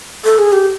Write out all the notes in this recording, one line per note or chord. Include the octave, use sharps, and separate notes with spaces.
A4
G#4
G4